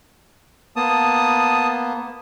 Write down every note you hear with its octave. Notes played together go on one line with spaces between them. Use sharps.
A#3 B3 A5 D#6